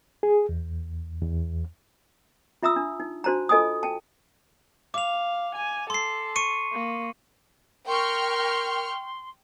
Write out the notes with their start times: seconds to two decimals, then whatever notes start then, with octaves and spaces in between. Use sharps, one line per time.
0.23 G#4
0.49 E2
1.22 E2
2.63 F4 E5 A#5 D#6 E6
2.76 D4
3.00 D#4
3.24 D4 F#4 C5 A5 A#5
3.49 F4 A4 D#5 G#5 A5 D#6
3.83 G5 A5
4.94 F5 D6 F7
5.56 G#5
5.90 A4 C6 C7
6.36 C#6 C#7 D#7
6.73 A#3
7.87 A#4 G5 C6 C#6 F6